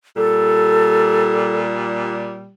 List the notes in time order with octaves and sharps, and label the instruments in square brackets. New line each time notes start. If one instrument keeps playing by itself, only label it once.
[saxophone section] A#2 G3 [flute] A4